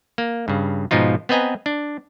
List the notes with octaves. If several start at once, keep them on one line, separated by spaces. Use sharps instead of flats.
A#3
G2 C#3
G#2 B2 F3 D#4 F4
B3 C4 B4 D#5 G#5 A#5
D4